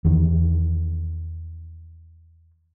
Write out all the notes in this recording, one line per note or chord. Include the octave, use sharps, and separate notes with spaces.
E2 D#3